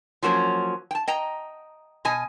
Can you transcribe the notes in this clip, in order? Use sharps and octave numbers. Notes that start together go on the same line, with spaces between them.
F3 F#3 A#3 C#4
G5 A5
D#5 G5 A#5
B2 D#5 G#5